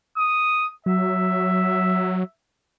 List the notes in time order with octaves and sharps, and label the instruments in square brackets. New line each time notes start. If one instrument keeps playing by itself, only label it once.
[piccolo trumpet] D#6
[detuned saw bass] F#3 [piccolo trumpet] E5